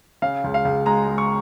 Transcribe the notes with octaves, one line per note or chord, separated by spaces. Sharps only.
C#3 F5
C#2
F5
C#2
G#3 A#5
G#3
C#6